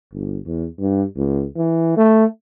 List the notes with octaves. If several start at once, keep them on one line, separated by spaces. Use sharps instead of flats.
G1
E2
G2
C#2
E3
A3